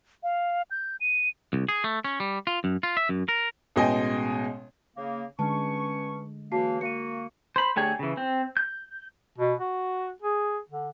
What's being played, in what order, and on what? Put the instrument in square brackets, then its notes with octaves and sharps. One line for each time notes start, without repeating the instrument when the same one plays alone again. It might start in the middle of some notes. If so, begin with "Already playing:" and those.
[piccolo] F5
G6
D#7
[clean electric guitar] C2
G#4
A3
C#4
G3
F4
F#2
F4
E5
F#2
A#4
[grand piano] A1 B2 G#3 D#5 G5 G#5
[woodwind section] C#3 A#3
[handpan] D3 G#3 [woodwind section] B3 C#4 C#6 [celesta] A5
[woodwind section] C#3 E3 A#3 [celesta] F#4 A5 C7
[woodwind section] A#3 F#4 [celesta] C#7 D#7
[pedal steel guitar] C5 B5
D3 A3 G4 G#4 C#5
C#3 E3
C4
G6
[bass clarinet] B2
F#4
G#4
D3